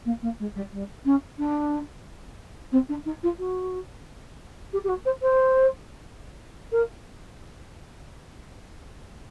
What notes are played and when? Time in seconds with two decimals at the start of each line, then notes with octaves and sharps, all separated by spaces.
0.05 A#3
0.22 A#3
0.40 G#3
0.56 G3
0.73 G3
1.05 C#4
1.39 D4
2.72 C4
2.89 D4
3.06 D#4
3.23 F4
3.39 F#4
4.73 G4
4.84 G4
4.89 F#4
5.06 C5
5.22 C5
6.72 A#4